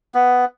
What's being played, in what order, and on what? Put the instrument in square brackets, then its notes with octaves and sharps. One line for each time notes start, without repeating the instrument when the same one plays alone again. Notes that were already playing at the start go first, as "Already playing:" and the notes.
[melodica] B3